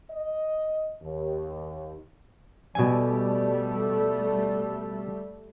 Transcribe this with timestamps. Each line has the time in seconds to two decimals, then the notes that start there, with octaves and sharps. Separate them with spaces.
0.10 D#5
1.02 D#2
2.75 B2 G3 A3 G#5